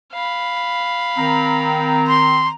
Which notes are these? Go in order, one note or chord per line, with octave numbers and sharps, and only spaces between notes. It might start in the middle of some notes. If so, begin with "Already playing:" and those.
F5 B5
D#3 C4 A#5
C6